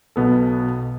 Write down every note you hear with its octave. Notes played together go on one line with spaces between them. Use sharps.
B1 B2 B3 A4